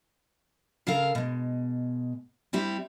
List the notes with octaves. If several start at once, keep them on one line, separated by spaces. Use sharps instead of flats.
C#3 A4 A#4 F5
B2 G#3
G3 C4 E4 G4